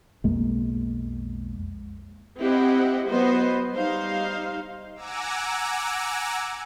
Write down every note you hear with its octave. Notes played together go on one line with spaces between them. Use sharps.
B1 F2 G#3 A#3
C4 E4 G4 D#5 F#5
F#3 B3 C5 D#5
G3 D#4 C5 F5
F#5 G#5 A#5 D6 E6